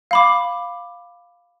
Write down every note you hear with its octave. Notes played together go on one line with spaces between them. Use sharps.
F5 B5 D6